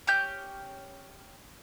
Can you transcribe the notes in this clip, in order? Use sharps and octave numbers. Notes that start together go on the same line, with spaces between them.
C#4 G4 G6